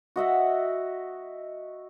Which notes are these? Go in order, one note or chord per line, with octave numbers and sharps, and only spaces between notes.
F#4 D#5 E5 F#5